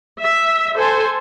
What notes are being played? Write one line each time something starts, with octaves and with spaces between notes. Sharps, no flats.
E5
A4 C5 G#5